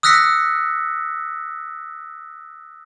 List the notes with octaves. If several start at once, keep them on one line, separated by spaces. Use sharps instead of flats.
D#6 E6 F#6 A#6 B6 C#7